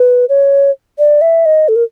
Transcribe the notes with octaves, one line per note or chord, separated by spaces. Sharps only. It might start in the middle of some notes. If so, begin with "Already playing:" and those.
Already playing: B4
C#5
D5
E5
D#5
A4
A#4